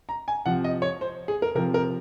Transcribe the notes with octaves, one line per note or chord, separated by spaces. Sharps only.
A#5
G#5
C3 F3 F#5
D#5
C#5
C5
G#4
A#4
C3 F3 A#4
A#4